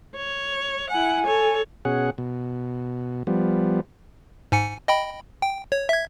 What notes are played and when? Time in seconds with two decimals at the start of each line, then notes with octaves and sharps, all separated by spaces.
0.16 C#5
0.90 E4 F#5 G#5
1.25 A4 C#5
1.85 B2 C#4 G#4 F#5
2.18 B2
3.27 F3 G3 B3
4.52 G#2 G#5 C#7
4.88 D#5 G5 B5
5.42 G5
5.72 C#5
5.89 E5 G#6